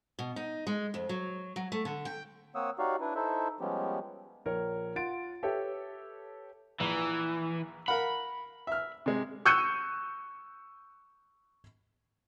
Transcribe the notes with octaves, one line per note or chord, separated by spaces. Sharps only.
B2
D#4
G#3
F2
F#3
F#3
A3
D3
G5
A#3 C4 C#5 F#5 D#6 E6
D#4 F#4 G4 C#5 D5 F5
D4 E4 B4
D#4 E4 A4 C5 E5
F3 G3 G#3 B3 C#4 G4
A#1 A#4 C#5
F4 F#5 A6 D7
G4 A4 B4 C#5 E5 G5
A#1 E3
A#4 F5 F#5 B5
E5 F6
C3 G#3
C#6 E6 F#6 G6 C#7 D#7